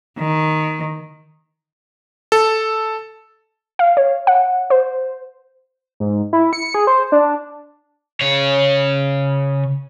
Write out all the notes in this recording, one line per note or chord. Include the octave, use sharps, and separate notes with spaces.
D#3
A4
F5
C#5
F#5
C5
G#2
E4
C#7
G#4
C5
D4
C#3 C#5